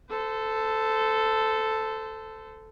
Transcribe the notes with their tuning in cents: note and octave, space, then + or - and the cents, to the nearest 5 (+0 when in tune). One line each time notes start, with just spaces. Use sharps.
A4 +0 C5 -30